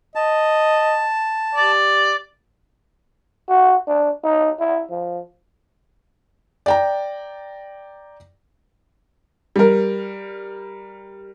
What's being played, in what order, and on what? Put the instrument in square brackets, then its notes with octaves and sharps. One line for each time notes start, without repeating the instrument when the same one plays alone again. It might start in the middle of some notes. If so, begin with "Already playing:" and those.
[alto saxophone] D#5 [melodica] A5
[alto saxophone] G4 [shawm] D5
[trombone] F#4
D4
D#4
E4
F3
[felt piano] D5 G5 A#5
[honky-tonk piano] G3 A#4